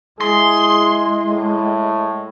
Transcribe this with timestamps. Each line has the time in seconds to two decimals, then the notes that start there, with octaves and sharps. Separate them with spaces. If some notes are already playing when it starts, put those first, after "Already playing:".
0.21 G#3 E4 G#4 C6
1.30 A2